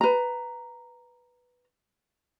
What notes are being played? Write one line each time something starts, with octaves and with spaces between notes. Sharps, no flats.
B4 A#5